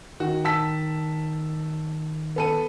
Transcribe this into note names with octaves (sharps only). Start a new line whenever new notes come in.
D#3 F#4
A5 E6 B6
B3 A4 D#7